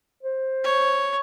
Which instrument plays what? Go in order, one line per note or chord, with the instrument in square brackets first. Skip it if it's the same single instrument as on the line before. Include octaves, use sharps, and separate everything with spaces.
[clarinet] C5
[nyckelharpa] C#5